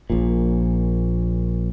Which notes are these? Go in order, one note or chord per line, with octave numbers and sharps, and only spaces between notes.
A#1 A#2